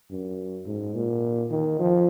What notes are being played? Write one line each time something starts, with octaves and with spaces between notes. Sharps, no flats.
F#2
G#2
A#2
D#3
F3